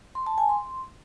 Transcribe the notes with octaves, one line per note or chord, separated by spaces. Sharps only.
C6
A5
G#5
C6